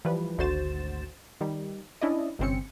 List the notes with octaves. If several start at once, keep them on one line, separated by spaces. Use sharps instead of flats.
E3 F3 G3 B4
G#1 D2 F#4 C5 A6 E7
D#3 G3
C#4 D4 E4 D5 D#5
G1 C3 C4 C#4 C#7